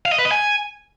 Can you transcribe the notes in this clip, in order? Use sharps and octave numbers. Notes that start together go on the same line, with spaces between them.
F5
D#5
B4
D#5
G#5